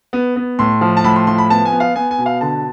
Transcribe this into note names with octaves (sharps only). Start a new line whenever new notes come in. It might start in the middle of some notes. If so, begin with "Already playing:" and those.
B3
B3
A2 C6
F3
A5
A2 B5
C6
F3 C6
B5
B3 A5
G#5
B3
F5
B3 G#5
G#5
B2
F5
D3 A5